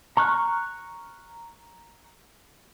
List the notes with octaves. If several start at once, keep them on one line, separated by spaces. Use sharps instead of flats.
A#5 C#6 F6 F#6